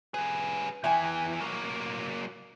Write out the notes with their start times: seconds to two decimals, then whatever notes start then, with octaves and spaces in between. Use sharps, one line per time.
0.14 G3 G#4 B4
0.84 E2 E3 E5 G5 G#5
1.41 F#3 A#3